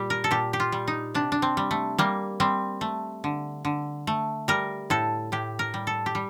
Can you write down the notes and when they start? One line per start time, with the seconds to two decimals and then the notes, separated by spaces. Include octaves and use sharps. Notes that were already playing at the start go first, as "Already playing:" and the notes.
Already playing: A#2 G3 G4
0.10 A#4
0.24 A4
0.31 A#2 G4
0.53 G4
0.60 F4
0.72 G3
0.87 D#4
1.14 C3 D4
1.32 D4
1.42 C4
1.57 G3
1.71 A3
1.98 G3 A#3
2.40 G3 C4
2.81 A3
3.24 D3
3.65 D3
4.07 A3
4.48 G3 A#4
4.90 A2 A4
5.32 A2 G4
5.59 A#4
5.74 G3
5.87 A4
6.06 G4
6.15 G3